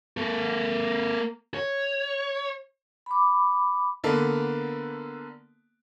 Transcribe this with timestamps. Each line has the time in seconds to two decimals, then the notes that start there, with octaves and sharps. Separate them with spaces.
0.17 A#3 A4
1.54 C#5
3.06 B5 D6
4.04 D3 A#3 B3 A4 B4